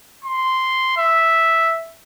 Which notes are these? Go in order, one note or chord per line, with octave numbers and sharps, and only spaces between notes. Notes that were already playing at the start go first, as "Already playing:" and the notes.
C6
E5